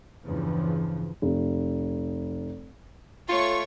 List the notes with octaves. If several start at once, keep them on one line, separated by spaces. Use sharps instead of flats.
E2 G2 C#3 E3 F3
F1
A3 F4 C#5 C#6